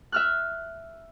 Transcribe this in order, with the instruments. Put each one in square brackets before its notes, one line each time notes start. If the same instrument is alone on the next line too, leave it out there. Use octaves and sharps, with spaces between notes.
[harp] E5 F6 F#6